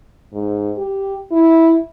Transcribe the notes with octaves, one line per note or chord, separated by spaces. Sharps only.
G#2
G4
E4